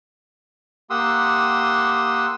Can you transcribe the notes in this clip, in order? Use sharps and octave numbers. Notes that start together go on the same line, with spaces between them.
A#3 G4 F#5 C6 D#6 E6